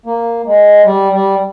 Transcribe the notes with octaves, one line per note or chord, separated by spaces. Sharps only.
A#3
G#3
G3
G3